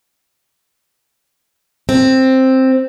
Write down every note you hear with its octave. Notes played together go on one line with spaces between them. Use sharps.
C4